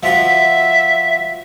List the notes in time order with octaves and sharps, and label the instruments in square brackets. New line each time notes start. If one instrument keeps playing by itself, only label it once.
[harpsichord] F3 F#4 [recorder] E5